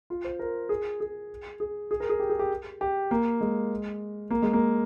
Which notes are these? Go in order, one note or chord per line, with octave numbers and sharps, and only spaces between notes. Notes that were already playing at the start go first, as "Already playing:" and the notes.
F4
C5
A#4
G#4
G#4
G#4
G#4
A#4
G#4
G4
G#4
G4
G4
A#3
G#3
A#3
G#3
A#3